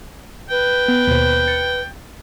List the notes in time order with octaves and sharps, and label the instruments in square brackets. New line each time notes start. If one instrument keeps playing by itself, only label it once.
[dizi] B4 [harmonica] G5
[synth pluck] B3
D#2 B2 C5
A6 C#7